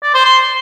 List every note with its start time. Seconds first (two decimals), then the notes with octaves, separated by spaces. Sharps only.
0.03 D5
0.14 C5
0.25 C6